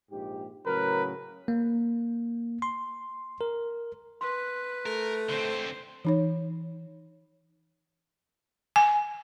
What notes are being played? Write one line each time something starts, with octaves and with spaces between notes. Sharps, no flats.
A#1 G#2 G4
A2 C#3 F#3 A#4 B4
A#3
C6
A#4
B4 C6
A3 A#4
D3 C4 C5
E3 D#4 C#5
G#5